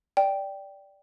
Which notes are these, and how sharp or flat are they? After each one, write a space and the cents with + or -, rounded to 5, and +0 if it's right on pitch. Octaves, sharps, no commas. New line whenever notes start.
D5 -5 G5 +0